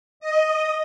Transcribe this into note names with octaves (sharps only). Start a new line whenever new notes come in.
D#5